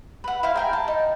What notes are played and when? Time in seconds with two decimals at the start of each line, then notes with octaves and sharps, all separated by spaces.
0.24 B4 F#5
0.43 E4 C5 F5
0.56 A#4 G5 G#5
0.73 A5
0.88 D#4